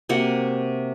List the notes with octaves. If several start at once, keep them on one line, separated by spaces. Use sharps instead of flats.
C3 A#3 F#4 F#5